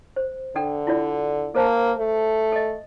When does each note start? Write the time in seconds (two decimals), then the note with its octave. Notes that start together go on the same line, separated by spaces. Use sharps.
0.16 C5
0.56 D3 D4 A4 G5
0.87 E4 F4 D5
1.55 A#3 A4 C5 A5
1.98 A3
2.52 A4 D#5